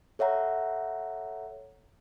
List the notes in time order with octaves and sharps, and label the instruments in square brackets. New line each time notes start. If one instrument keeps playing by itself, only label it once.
[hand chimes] A4 C#5 E5 F#5 A#5